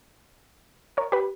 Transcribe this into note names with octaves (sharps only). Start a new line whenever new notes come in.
A#4 C#5
G4 B4